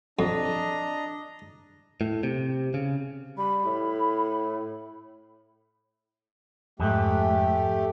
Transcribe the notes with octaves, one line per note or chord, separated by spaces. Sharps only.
F2 D4 D#5 A#5
A2
C3
C#3
G3 B5
A2
F2 G#2 A3 G4